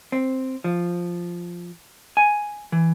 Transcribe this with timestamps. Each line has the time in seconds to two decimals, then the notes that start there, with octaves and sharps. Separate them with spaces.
0.12 C4
0.64 F3
2.17 G#5
2.72 E3